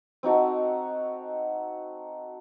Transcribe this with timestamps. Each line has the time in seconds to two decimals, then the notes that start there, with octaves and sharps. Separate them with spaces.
0.23 C4 D#4 F#4 A4